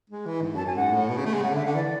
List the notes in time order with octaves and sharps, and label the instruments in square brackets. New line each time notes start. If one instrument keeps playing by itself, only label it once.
[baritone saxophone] G#3
E3
G#2
[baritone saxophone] F#2 [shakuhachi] A5
[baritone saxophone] F#2 [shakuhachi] G#5
[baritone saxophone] G#2 [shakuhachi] F#5
[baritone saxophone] A2
B2
C#3
A3
G#3
[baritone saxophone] C#3 [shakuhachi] F#5
[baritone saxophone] D3 [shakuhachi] E5
[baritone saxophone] D3 [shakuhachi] F#5
[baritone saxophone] E3 [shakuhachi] D5